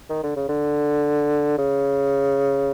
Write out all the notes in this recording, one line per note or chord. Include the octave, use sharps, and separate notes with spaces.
D#3
D3
C#3
D3
C#3